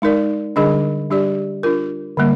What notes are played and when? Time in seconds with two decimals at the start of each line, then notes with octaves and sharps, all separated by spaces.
0.02 G#3 D#4 A#4 D5
0.56 D3 G3 D4 G#4 D#5
1.10 G3 D4 G4 D5
1.63 D4 F4 A#4
2.17 D3 G3 A#3